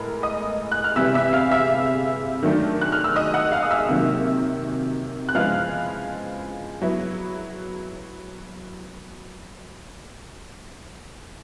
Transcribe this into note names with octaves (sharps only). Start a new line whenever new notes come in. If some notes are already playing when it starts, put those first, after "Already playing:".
Already playing: A2 G#3 B3 A#4 A#5
D#5 D#6
F#6
F6
C3 E3 G3 B3 E5 E6
E5 E6
F5 F6
E5 E6
D#3 F#3 A3 D4
F#6
F6
E6
D#5 D#6
F#5 F#6
F5 F6
D#6
E5 E6
C3 D#3 F#3 A#3
F#6
C#3 F3 G#3 B3 E4 F5 F6
F#3 B3 E4